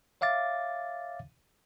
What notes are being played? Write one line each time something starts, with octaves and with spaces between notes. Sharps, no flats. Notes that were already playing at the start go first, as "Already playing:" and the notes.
C#5 E5 F5 D6 A6